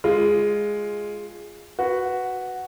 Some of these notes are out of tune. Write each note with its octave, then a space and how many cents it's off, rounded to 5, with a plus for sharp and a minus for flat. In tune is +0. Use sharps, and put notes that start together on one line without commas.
G#3 +0 F4 +0
F#4 +0 B4 +0